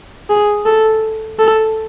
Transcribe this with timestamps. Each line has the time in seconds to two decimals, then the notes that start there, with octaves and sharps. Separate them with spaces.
0.30 G#4
0.65 A4
1.39 A4